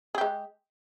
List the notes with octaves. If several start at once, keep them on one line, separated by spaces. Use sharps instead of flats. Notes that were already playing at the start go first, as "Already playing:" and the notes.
G#3 G4 G#4